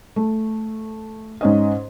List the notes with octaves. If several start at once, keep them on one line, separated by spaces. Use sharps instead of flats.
A3
G#2 C#4 D#5